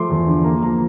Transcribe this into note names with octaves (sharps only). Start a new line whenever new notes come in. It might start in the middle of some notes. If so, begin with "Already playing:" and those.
Already playing: F3 A3 C6 D6
E2
D3
A#3 A#5
F3 A#5